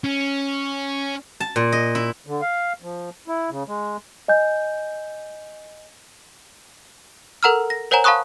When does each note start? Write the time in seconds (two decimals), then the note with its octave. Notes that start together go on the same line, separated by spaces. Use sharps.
0.04 C#4
1.40 A5
1.56 A#2
1.72 D#5
1.95 E4
2.27 D3
2.41 F5
2.82 F3
3.28 E4
3.50 C#3
3.68 G#3
4.28 D#5 G#5 G6
7.43 A4 A#4 F#5 A#5 E6 F6
7.70 A#6
7.91 A#4 C5 C#5 F#5 G#5 A#5
8.04 F5 A5 B5 C#6 D#6 F#6